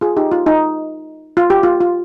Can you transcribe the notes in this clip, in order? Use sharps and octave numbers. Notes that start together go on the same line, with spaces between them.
F4 G#4
D#4 G4
F4
D#4
F4
G4
F4
F4